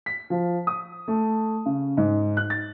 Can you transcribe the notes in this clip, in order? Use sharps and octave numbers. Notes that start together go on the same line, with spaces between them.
B6
F3
D#6
A3
C#3
G#2
F#6
A6